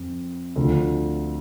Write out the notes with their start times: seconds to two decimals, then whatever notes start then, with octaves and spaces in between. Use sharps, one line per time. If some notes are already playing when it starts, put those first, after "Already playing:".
Already playing: F2
0.56 D2 D3 F3